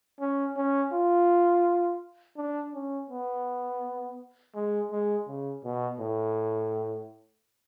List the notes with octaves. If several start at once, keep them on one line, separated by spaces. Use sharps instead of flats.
C#4
C#4
F4
D4
C#4
B3
G#3
G#3
C#3
B2
A2